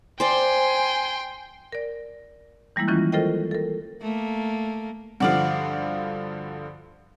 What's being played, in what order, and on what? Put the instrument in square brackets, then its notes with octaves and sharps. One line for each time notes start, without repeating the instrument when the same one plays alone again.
[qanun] C5 D5 [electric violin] G5 C6 [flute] G#5
[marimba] A#4 D5
E3 G3 G#3 A#3 E4
D#3 E3 F#3 C#4 E4 F4
F4 A4 A#4 C5 D#5 G5
A4 A#4
[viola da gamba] A3 A#3
[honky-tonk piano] G2 D3 F3 [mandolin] F#4 D5 F5